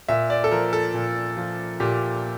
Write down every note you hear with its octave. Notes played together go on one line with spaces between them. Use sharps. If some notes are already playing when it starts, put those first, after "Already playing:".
A#2 E5
D5
A4
F3 A#4
A4
A#2
F3
A#2 G4